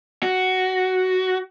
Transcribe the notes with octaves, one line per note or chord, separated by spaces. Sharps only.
F#4